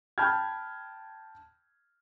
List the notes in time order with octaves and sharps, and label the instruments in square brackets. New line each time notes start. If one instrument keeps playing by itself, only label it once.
[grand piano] G5 A5 B5 F6 G6 G#6